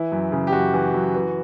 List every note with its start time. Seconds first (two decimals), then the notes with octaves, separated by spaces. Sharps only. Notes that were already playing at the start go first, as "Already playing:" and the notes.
Already playing: E3 E4
0.12 F#2
0.32 C#3
0.47 G4
0.53 F#2 F#4
0.74 E3
0.94 F#2
1.15 E3